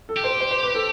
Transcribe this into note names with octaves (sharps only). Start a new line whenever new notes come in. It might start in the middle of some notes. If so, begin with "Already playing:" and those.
A4
G4
C5
C5
C5
B4
A4